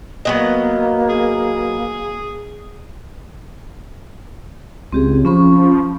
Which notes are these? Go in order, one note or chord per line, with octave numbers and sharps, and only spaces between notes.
F#3 A#3 B3 D#5
G#4
C#2 C4 G4 G#4
F3 C#4 B5 C#6